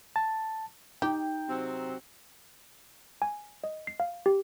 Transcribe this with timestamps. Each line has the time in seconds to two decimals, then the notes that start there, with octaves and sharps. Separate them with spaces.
0.16 A5
1.02 D#4 G4 G5
1.49 C3 F#3 C4
3.22 G#5
3.64 D#5
3.87 C7
4.00 F5
4.26 G4